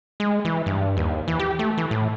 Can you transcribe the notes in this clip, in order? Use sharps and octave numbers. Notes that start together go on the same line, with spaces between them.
G#3
E3
G2
D#2
E3
G4
A3
E3
A2